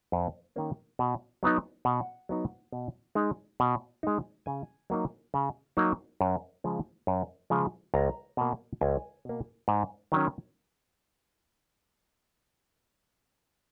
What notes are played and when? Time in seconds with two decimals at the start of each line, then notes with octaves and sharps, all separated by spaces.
0.12 F2
0.56 D#3 A#3 C#4
0.99 B2
1.43 F#3 B3 D#4
1.85 B2 F#5
2.29 F#3 B3 D#4
2.72 B2
3.15 G#3 D#4
3.60 B2
4.03 G#3 D#4
4.46 C#3 G#5
4.90 F#3 A#3 D#4
5.34 C#3
5.77 F#3 A#3 D#4
6.21 F#2
6.64 C#3 F3 G#3
7.07 F#2
7.50 C#3 F3 G#3
7.94 C#2 A#5
8.37 B2 A#3
8.81 C#2 G#5
9.25 B2 A#3
9.68 G#2
10.12 D#3 F#3 C#4